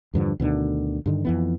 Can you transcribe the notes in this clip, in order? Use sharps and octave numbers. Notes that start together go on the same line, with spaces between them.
E2 G2 D3 F3
D2 B2 D3 D#3
G2 D3 D#3
F2 E3 B3